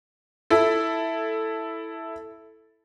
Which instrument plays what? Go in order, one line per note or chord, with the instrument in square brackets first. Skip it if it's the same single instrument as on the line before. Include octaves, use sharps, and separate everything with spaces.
[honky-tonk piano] E4 A4